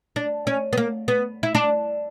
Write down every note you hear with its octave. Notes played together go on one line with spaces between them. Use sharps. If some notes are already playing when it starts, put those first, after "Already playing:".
D4
C#4
B3
A#3
B3
E4
D4